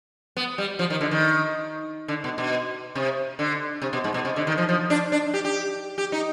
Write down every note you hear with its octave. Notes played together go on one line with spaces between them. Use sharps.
B3
G3
F3
D#3
D3
D#3
D3
B2
B2
C3
D3
C3
B2
G#2
B2
C3
D3
D#3
F3
F3
D4
D4
G4
G4
G4
D#4